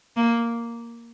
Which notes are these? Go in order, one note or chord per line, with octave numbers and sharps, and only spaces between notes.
A#3